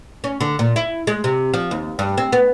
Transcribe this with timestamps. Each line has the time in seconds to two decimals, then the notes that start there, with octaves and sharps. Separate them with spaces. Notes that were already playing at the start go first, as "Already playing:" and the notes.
0.24 C#4
0.40 D3
0.59 A#2
0.76 E4
1.07 G#3
1.24 C3
1.54 F3
1.71 D#2
1.99 G2
2.18 C4
2.32 B3